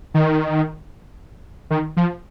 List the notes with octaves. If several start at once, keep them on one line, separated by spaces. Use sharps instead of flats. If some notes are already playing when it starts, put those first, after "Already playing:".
D#3
D#3
F3